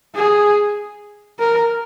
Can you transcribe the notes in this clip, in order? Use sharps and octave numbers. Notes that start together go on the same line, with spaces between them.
G#4
A#4